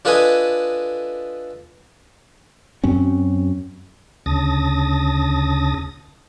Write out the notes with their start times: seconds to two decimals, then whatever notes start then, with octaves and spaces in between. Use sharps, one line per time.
0.05 D4 F4 A4 B4 D#5 G#5
2.84 F#2 F#3 C4 C#4
4.26 D2 C#3 A5 D#6 A#6